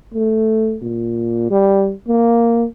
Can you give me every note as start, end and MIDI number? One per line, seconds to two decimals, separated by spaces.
0.14 0.77 57
0.82 1.48 46
1.50 1.92 55
2.08 2.66 58